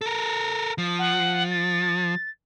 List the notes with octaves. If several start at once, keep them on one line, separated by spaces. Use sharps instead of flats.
A4 A#4
F3
F#5
A6